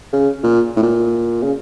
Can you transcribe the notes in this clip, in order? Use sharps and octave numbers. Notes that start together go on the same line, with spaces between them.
C#3
A#2
A2
A#2
C#3